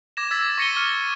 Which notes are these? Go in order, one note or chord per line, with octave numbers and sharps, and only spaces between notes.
D6 G#6 A#6 E7
E6 G#6 A6 B6
C#6 A#6 C#7 D#7 G7
F6